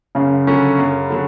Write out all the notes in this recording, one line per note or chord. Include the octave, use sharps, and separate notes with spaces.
F#2 C#3
D3 F#3 C#4
F#2
D3 F#3